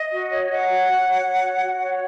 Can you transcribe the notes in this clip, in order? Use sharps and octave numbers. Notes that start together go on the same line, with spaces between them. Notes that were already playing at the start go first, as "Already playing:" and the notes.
Already playing: D#5
F#4
C#5
C#5 F#5
F#4
F#4
C#5
C#5
F#4
F#4
C#5